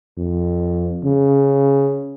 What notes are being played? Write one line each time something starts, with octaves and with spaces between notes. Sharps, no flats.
F2
C#3